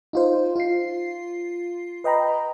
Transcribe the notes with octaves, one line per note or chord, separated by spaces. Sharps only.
D#4 F4 C5
F4 C7
B4 D#5 G5 A#5 B5